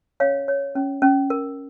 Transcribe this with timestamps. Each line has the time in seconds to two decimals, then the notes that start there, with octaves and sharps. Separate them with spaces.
0.20 C#4 C#5 F5
0.48 C#5
0.75 C#4
1.02 C#4
1.30 A#4